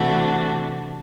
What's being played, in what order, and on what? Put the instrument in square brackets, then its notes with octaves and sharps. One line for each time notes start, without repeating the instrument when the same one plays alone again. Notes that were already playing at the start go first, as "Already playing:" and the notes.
Already playing: [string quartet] C3 E3 A3 D4 F#4